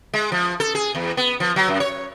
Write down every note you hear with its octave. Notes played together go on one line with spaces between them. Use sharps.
G#3
F3
A4
G#4
E2
B3
F3
F#3
F#2
C#5